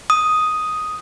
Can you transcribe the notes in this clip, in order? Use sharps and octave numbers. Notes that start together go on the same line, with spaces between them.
D#6